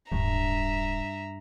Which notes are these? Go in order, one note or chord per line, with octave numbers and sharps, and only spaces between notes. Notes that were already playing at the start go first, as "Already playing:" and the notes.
D1 G2 E5 A#5